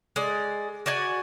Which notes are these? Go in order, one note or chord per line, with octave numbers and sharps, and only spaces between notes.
G#3 D5
F#4 D5 F#5 G#5